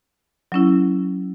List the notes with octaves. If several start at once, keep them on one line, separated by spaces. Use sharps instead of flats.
F#3 C#4 E4